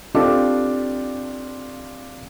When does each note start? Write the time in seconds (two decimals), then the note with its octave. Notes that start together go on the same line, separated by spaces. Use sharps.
0.15 C4 D4 F4 G4 A4